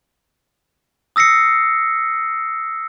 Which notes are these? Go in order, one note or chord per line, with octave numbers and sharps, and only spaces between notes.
D#6 E6 A#6 C7 C#7